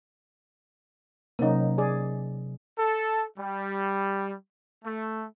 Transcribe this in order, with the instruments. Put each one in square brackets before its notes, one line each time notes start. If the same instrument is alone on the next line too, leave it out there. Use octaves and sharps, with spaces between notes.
[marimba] C3 F#3 [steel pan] A#3 C#4 D#4
[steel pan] G#4 D5
[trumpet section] A4
G3
A3